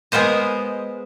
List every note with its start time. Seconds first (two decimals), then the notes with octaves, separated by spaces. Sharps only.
0.12 G#3 B3 A#4 C5 D#5